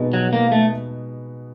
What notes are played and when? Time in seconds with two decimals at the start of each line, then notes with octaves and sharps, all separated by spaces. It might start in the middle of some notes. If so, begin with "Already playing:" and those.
Already playing: B2 G#3 B3 D#4
0.13 F#3
0.33 A#3
0.52 A3